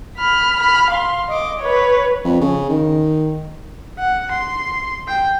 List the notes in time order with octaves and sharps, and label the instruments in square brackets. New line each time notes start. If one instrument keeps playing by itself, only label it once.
[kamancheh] B5 F6
B5 F6
F5 C6
D#5 D6
B4 C#5
[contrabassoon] F2
C#3
D#3
[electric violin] F#5
C6
G5